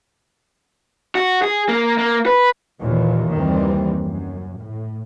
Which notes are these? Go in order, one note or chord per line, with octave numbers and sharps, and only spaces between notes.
F#4
G#4
A#3
A#3
B4
D#2 A#2 E3
F#1 D#2 D#3 E3 G3 C4
F#2
A2